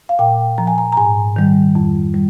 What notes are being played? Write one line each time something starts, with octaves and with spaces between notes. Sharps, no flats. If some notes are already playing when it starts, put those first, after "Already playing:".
F5
A#2 G5
F3 A#5
G#5
A#5
A#5
G#2 G#5
D#3 G3
F2
G3